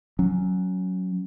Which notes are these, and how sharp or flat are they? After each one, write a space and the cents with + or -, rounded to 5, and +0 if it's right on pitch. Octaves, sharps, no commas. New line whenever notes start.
F#3 +0 C#4 +0